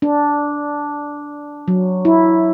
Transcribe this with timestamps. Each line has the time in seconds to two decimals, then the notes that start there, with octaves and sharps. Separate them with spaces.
0.02 D4
1.68 F#3
2.05 E4